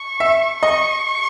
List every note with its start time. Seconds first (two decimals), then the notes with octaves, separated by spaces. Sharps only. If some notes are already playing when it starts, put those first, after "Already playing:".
Already playing: C#6
0.20 E5
0.63 D#5 C#6